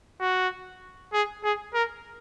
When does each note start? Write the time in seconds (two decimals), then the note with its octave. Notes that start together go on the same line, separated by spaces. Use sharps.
0.21 F#4
1.13 G#4
1.44 G#4
1.74 A#4